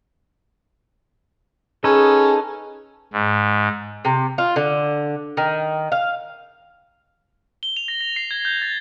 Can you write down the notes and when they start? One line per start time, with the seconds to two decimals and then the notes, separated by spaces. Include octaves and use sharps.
1.84 C#4 D#4 G#4 A4 B4
3.13 G#2
4.05 C3
4.38 F4
4.56 D3
5.37 D#3
5.92 F5
7.63 G7
7.77 F7
7.88 A#6
8.01 A#6
8.16 C7
8.31 G#6
8.45 G6
8.62 A6